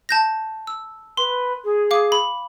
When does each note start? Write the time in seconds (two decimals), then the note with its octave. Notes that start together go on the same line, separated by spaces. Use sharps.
0.09 A5 G6 A#6
0.67 E6
1.17 B4 C6
1.64 G#4
1.91 F5 D6
2.12 B5